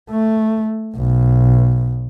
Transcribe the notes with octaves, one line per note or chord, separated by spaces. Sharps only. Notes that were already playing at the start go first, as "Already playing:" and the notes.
A3
B1